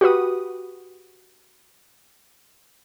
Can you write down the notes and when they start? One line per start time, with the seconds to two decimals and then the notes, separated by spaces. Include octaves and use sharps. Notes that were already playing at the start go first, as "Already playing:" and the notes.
0.01 F#4 G4 B4 D#6